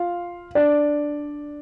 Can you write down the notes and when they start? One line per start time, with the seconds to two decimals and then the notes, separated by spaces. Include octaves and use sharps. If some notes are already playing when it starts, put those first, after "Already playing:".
Already playing: F4 F5
0.55 D4 D5